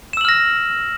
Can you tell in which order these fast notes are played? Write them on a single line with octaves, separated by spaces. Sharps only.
E7 E6 F#7 F6 A#6